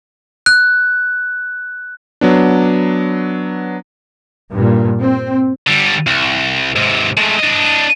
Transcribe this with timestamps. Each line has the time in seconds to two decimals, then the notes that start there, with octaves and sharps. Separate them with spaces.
0.46 F#6
2.21 F#3 B3 D4
4.51 G2 A#2
4.98 C4
5.67 D3 G3
6.07 C2
6.76 G#2 C3
7.17 G#3 A3
7.39 D4 D#5